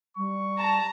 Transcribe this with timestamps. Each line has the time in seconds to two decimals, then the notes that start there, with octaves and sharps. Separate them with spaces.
0.17 G3 C#6
0.57 A5 A#5